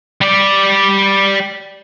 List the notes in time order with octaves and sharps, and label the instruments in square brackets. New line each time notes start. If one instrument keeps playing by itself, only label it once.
[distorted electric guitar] G3 D5